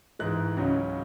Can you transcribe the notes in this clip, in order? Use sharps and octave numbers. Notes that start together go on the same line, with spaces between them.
G#2 E3 G#3 F#6
C#2 C#3 F#3 C#4